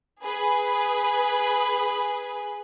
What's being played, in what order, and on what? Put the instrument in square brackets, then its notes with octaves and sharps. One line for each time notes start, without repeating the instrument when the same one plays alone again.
[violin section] G#4 B4